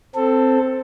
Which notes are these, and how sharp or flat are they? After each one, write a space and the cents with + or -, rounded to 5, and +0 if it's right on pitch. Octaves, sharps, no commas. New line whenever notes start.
C4 +0 A4 +10